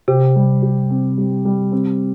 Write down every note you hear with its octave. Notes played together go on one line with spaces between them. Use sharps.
C3 G4
G3
G4
C4
G3
G3
C4